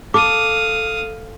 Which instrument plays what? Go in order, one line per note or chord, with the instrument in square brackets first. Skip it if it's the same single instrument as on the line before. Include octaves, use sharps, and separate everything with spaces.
[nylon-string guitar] A4 [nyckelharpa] F5 D#6 [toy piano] D6